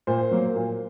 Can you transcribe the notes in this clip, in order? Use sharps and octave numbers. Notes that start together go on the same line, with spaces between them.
A#2 C5
F#3 A#3
A#2